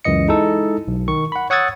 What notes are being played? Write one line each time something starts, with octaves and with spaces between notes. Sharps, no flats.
C#2 F#2 E3 D#5 C#7
G#3 D#4 E4 A4
B1
D#3 C#6
F#5 B5
C#5 F#5 D#6 E6 G#6 A6